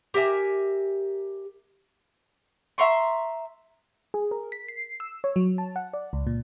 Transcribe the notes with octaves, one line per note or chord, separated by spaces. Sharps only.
G4 A#4 E5 G#5
E5 A#5 C6 C#6
G#4
A#4
B6
C7
E6
C#5
F#3
A5
F#5
D5
C#2
A#2